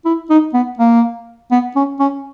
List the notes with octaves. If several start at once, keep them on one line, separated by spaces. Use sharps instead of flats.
E4
D#4
B3
A#3
B3
C#4
C#4